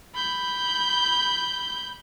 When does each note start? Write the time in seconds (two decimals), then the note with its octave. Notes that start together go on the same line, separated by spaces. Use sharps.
0.15 B5 G6